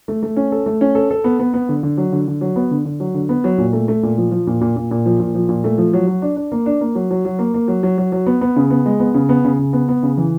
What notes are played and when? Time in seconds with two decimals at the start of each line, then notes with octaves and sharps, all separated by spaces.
0.08 A3
0.23 A3
0.36 C#4
0.52 A4
0.66 A3
0.81 C#4
0.95 A4
1.11 A4
1.24 B3
1.39 B3
1.54 B3
1.69 D3
1.83 D3
1.98 F#3
2.12 D3
2.28 D3
2.41 F#3
2.56 B3
2.71 D3
2.85 D3
3.00 F#3
3.14 D3
3.29 B3
3.44 F#3
3.58 A#2
3.73 A3
3.88 A3
4.03 A#2
4.18 F3
4.31 F3
4.47 A#2
4.61 A#2
4.76 A#2
4.91 A#2
5.06 F3
5.20 A#2
5.35 F3
5.49 A#2
5.64 A3
5.78 F3
5.94 F#3
6.07 F#3
6.22 D4
6.36 D4
6.52 A#3
6.66 D4
6.81 A#3
6.95 F#3
7.11 F#3
7.25 F#3
7.39 A#3
7.54 A#3
7.68 F#3
7.83 F#3
7.98 F#3
8.12 F#3
8.27 B3
8.41 B3
8.56 C#3
8.70 B3
8.86 G#3
9.00 B3
9.14 C#3
9.29 B3
9.44 C#3
9.59 C#3
9.73 B3
9.89 B3
10.03 C#3
10.17 E3